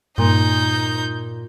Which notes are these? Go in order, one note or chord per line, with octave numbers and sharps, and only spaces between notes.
G2 A#2 D#4 G6